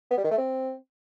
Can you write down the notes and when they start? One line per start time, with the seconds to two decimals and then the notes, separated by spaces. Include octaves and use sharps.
0.11 B3
0.17 G3
0.24 D#3
0.31 A3
0.38 C4